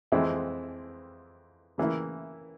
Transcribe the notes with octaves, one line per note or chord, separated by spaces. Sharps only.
F2 E3 G#3 C4 E4
C#3 E3 A#3 E4